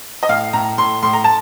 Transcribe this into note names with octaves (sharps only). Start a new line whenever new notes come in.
D#5
A2 F5
A2 A#5
A2 C6
A2 C6
A#5
A5